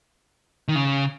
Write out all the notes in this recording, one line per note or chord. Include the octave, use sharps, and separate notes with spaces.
D#3
C#3